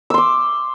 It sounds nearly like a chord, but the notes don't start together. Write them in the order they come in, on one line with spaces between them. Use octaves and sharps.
E6 C6 D6